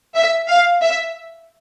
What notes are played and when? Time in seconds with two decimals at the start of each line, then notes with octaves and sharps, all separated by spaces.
0.15 E5
0.49 F5
0.82 E5